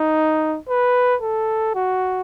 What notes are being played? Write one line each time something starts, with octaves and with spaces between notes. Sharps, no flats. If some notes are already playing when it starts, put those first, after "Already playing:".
Already playing: D#4
B4
A4
F#4